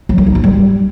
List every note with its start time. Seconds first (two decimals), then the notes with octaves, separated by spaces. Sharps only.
0.09 F#3
0.18 G3
0.26 D#4
0.35 G#3
0.44 G3